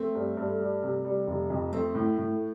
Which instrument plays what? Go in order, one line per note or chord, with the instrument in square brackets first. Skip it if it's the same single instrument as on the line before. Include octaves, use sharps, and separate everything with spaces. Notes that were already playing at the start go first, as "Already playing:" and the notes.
Already playing: [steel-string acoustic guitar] A3 [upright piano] C4
[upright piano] G2
G2
G3
C3
G3
F1
F2
[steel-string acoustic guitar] A3 [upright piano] C4
[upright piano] A2
A2